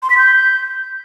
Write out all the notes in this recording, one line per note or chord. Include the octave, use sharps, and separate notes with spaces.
C6
B6
G6